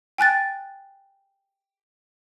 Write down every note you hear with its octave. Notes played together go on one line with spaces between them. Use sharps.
G5 G#5 F#6 A6